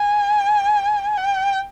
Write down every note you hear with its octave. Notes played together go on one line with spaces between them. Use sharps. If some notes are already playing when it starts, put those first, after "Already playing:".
Already playing: G#5
G5